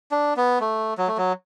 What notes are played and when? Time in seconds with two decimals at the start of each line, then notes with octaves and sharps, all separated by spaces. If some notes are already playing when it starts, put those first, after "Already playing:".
0.11 D4
0.37 B3
0.60 A3
0.98 F#3
1.08 A3
1.18 F#3